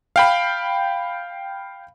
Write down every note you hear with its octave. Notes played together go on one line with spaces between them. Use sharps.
F5 G5 B5